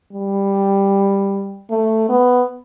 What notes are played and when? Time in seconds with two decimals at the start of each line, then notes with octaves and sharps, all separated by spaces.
0.13 G3
1.70 A3
2.09 B3